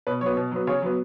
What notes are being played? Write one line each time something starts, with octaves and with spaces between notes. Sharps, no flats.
B2 B4
F#3 B3 C#5
B2
F#3 B3
C#3 C#5
F#3 B3